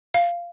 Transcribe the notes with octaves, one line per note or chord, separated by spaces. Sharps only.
F5